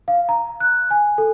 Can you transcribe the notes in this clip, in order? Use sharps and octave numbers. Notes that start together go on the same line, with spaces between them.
F5
A#5
F#6
G#5
A4